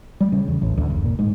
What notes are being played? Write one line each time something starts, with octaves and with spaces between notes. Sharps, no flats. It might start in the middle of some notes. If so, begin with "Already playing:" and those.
G3
C#3
E2
A1
D2
F#1
A#2
G#2